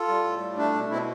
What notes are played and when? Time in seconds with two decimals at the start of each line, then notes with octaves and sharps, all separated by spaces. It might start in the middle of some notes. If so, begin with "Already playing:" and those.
Already playing: F4 A4
0.08 G3
0.24 A2
0.41 G3
0.57 A3 D4
0.73 B2
0.90 B2 C4 E4